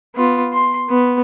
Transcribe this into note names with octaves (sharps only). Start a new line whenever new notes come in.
B3 F4
C6
B3